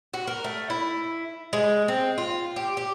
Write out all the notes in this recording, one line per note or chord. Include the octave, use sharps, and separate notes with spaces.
F#4
A#4
A3
E4
G#3
C4
F4
G4
G4